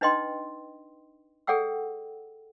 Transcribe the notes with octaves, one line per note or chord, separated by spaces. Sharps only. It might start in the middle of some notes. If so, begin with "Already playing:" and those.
D4 D#4 B4 D#5 G5 C6
G#4 A4 D5 F#5 G5 E6